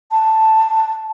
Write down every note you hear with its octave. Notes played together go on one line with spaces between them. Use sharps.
A5